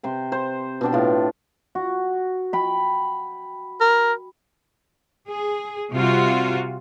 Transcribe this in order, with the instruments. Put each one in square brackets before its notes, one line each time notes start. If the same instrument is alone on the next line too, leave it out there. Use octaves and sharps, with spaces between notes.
[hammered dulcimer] C3 C5 G5
C5
B2 D4 G5
A2 F4
F#4
G5 B5
[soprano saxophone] A#4
[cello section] G#4
C3 G3 F4 F#4